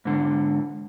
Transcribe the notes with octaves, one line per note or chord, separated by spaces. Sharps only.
G#2 D3